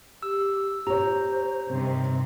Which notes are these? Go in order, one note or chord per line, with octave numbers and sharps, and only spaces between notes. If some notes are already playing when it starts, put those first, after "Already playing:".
G4 E6
G4 C5 C#5 A#5
G2 C3 D#3 C4